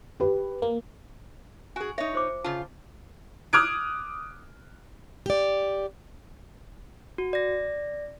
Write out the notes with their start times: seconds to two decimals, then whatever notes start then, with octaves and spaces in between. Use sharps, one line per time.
0.20 G4 B4
0.62 A#3
1.76 F#4 G#4 G#5
1.98 D#4 C#5 E5
2.13 F4 C5 D6
2.44 C#3 F4 A5
3.53 D6 D#6 F6 F#6 G#6 D7
5.26 G4 D5
7.18 F#4
7.33 D5 A#6